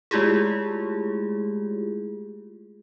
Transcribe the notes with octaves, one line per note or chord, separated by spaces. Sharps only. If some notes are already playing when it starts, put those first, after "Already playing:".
G#3 A3 E4 F4 G4 G#4